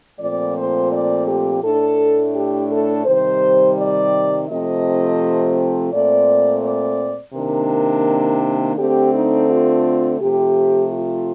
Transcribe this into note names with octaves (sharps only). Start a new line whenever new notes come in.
A#2 F3 A3 C4 D5
C5
D5
G4
A2 A3 D4 A4
G4
A4
C3 D#3 G3 C5
D5
C3 F3 A3 C4 D#5
A#2 A3 C4 D5
D5
C3 D#3 A#3 D4 A#4
D3 A3 C4 G4
D#4
F4
C3 F3 A3 G4
F4